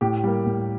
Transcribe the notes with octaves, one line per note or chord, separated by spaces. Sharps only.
A2 G4
G3 A#3
A2